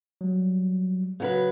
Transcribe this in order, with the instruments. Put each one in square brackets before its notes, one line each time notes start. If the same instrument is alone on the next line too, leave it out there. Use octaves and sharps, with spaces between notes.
[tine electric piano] F#3 G3
[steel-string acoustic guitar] C#3 F#3 B4